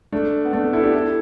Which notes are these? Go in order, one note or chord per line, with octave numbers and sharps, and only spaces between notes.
A3 D4
B3
A3 D4
E4 A4
D4 G4
E4 A4